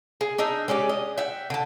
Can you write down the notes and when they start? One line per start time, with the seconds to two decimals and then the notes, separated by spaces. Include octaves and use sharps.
0.21 G#4
0.38 D4 D#4 D#5 E5
0.68 G#3 C#4 G4 D5
0.89 D#5
1.18 E5 F#5 G5
1.50 D3 A5